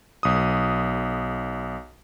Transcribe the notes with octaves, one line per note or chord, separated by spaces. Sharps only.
B1 D#6